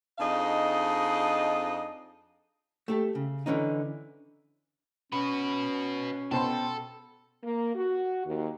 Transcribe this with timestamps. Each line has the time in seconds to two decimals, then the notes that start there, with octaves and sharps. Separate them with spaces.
0.19 F2 D4 D#4 G#4 D#5 F5
2.88 A3 G4 A4
3.15 C#3
3.46 D3 E3 C#4 D#4
5.12 C#4 F#4 B4 B5 C#6
6.31 B2 A4 C5 G5 B5 C6
7.43 A#3
7.75 F#4
8.27 D#2